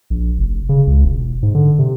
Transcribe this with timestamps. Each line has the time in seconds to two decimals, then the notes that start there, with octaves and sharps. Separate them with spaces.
0.10 A#1
0.38 F1
0.69 C#3
0.87 C#2
1.05 E1
1.43 G#2
1.55 D3
1.79 C3